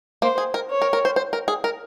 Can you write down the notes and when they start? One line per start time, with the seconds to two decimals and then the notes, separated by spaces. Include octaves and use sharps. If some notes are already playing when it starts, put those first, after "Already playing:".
0.22 A#3 C5
0.38 G#4
0.54 A#4
0.70 C#5
0.82 A#4
0.93 A#4
1.05 C5
1.16 C5
1.33 A#4
1.48 G#4
1.64 A#4